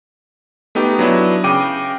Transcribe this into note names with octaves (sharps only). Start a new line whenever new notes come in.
A3 B3 D#4 G4
F#3 B3 D4 E4
C#3 G5 D6 D#7